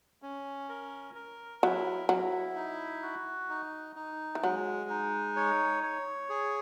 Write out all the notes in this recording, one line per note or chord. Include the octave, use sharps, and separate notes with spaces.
C#4
A#4
A#4
F#3 E4
F#3 E4
D#4
F#4
D#4
D#4
E3
F#3 G#3
D#4
C#5
C#5
G#4